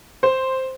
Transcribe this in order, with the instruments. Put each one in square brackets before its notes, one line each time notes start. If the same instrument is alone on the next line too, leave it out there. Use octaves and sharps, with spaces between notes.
[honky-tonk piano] C5